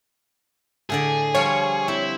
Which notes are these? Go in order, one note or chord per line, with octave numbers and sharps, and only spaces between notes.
A2 D3 G#4 D5
F3 G3 F4 C#5
C4 E4